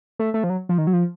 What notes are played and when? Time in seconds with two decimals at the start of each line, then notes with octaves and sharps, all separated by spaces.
0.19 A3
0.34 A3
0.44 F3
0.50 F#3
0.69 F3
0.78 D#3
0.87 F#3
0.93 F3